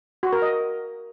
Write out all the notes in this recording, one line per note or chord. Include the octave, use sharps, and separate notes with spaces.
F#4
A#4
D#5